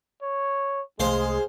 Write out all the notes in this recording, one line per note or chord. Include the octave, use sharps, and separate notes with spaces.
C#5
C2 G#3 A3 G#4 C5 F5 C6